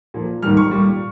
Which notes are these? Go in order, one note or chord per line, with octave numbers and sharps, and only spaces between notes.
A#2 F3
G#2 D#3 G3 F6
C#6
A#2 G3